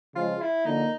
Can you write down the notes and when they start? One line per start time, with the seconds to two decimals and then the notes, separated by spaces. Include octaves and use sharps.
0.15 C#3 F3 G#3 F4
0.41 E4
0.66 D3 F3 A#3 D#4